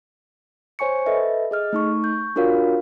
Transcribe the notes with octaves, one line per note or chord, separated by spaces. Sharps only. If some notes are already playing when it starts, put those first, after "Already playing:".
C5 C#5 G#5 C#6 C#7
A4 B4 D#5 E5
G#4 D#5 F6
A3 D#4 C#6
C#6 G6
D4 F4 F#4 A#4 C#5 F5